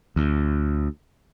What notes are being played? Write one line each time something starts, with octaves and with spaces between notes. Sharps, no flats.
D2